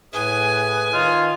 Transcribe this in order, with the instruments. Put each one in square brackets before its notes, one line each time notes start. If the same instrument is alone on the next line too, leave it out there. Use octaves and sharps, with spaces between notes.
[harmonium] A2 G#4 [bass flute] B4 [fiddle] G#5
[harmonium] D#3 D#5 [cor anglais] F4